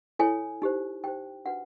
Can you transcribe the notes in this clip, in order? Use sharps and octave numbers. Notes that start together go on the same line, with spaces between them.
E4 A4 C#5 G#5
D#4 G4 C5
D#4 G4 C5 G5
D4 F#4 B4 F#5